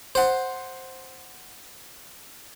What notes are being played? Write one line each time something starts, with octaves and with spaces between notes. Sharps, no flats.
C5 F#5